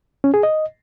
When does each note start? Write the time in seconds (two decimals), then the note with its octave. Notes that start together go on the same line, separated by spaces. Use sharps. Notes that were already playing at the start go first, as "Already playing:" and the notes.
0.24 C#4
0.34 G#4
0.43 D#5